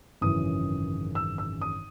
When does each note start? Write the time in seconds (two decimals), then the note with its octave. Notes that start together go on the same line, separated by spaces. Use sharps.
0.21 G#1 F#2 C#3 E3 D#6
1.15 E6
1.38 E6
1.61 D#6